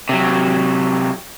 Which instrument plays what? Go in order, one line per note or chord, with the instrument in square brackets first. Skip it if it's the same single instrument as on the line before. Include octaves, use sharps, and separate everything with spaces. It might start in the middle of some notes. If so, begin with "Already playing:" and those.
[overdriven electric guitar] C3 F#3